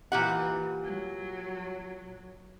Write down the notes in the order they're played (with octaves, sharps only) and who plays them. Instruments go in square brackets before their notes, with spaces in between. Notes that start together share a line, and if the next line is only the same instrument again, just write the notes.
[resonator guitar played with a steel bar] A#2 G4 F#5 [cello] E3
[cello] F#3